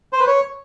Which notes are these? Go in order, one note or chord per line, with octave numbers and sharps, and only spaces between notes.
C5
B4
C#5